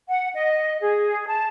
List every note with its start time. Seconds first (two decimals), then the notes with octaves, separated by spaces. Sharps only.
0.08 F#5
0.33 D#5
0.81 G#4
1.27 A5